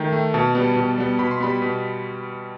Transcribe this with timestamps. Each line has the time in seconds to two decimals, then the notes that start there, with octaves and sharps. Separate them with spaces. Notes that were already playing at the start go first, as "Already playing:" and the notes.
Already playing: D#3 A3 G5
0.12 A3
0.34 B2 A5
0.55 G3 B3
0.76 B2
0.97 G3 B3
1.19 B2 B5
1.31 C6
1.40 G3 B3 B5
1.62 B2